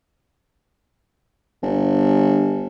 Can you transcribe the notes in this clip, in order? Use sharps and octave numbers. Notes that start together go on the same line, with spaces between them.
G1